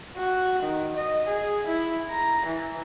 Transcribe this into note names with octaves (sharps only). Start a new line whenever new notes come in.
F#4
D#3
D#5
G#4
E4
A#5
E3